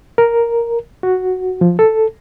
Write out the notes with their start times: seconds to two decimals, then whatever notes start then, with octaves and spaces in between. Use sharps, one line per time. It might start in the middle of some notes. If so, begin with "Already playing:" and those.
0.18 A#4
1.03 F#4
1.61 F3
1.79 A4